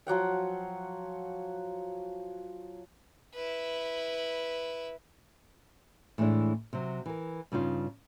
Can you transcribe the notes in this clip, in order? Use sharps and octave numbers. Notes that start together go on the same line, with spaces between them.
F3 F#3 F#5 G5
E4 B4
A2 E3 G#3 A3 D4 E4
C3 F#3
E3 A#4
G2 C#3 D#4 F4